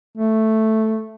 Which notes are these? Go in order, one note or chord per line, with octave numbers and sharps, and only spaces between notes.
A3